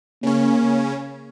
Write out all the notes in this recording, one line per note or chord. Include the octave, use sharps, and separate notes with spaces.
C#3 A#3 C#4